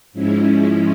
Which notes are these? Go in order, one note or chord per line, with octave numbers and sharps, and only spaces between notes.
G#2 F3 G#3 C#4 E4